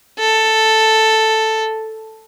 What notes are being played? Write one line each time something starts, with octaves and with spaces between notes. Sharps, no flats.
A4